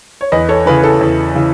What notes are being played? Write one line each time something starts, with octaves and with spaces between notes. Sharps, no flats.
C#5
E2 B4 D#5
A4 C#5
C#3 E3 G#4 B4
A4
E2
C#3 E3